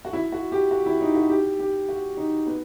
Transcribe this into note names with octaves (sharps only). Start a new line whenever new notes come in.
F#4
E4
F#4
G4
F#4
E4
D#4
F#4
G4
G4
F#4
D#4
B3